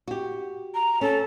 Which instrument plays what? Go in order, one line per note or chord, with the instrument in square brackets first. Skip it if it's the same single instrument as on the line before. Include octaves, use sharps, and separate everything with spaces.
[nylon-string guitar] F#4 G4
[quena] A#5
[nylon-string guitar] C#4 [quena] A4